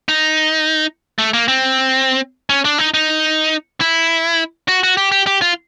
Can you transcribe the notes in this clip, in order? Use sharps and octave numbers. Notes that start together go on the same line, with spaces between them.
D#4
A3
A#3
C4
C#4
D4
D#4
D#4
E4
F#4
F#4
G4
G4
G4
F4